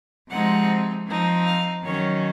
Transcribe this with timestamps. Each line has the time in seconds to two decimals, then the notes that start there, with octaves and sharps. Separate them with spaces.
0.29 C3 F3 G#3 C4 D#4 F#5
1.07 F3 C4 D#4
1.46 F5
1.84 D#3 F#3 C#4 C#5